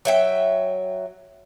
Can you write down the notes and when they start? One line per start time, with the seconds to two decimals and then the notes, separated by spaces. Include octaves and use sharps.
0.05 F#3 E5 G5